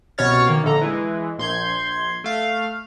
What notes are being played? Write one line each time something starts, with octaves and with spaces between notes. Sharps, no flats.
C2 B2 C#4 C#5 F6 A6
D#3 A#3
A#1 D3 A4 A#5
E3 G#3
A#1 C6 G6 G#6
A3 F5